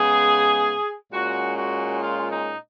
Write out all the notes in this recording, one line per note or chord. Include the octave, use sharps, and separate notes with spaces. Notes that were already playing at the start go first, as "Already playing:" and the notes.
Already playing: C#3 G#3 B3 G#4
A#2 G#3 C#4 F#4
F#4
F4
D#4